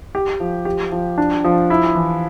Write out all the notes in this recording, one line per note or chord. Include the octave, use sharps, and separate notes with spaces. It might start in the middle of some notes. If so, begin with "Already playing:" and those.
G4
F3
G4
F3
D4
F3
E4
E3